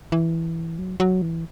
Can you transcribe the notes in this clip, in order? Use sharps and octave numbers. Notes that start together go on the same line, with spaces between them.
E3
F#3
F#3
E3